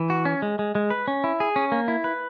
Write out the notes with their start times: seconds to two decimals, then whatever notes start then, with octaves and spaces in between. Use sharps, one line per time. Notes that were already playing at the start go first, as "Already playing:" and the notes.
Already playing: E3
0.10 F#4
0.25 C#4
0.42 G#3
0.59 G#3
0.75 G#3
0.90 B4
1.08 C#4
1.24 E4
1.40 G#4
1.56 C#4
1.72 A#3
1.88 E4
2.04 B4